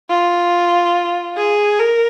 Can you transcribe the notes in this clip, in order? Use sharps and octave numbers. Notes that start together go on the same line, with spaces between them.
F4
G#4
A#4